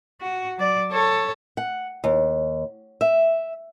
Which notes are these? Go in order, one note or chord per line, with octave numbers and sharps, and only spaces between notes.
F#4
F#3 D5
A4 C#5
F#5
D#2
E5